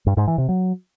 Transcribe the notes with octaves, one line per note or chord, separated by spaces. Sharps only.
G2
G#2
E3
C3
F#3